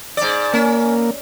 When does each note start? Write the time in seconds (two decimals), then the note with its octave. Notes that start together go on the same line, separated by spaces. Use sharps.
0.17 G#2 D5
0.54 A#3 C#4